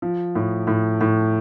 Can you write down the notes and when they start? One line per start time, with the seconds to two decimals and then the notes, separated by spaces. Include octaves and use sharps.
0.02 F3
0.35 A2
0.67 A2
1.01 A2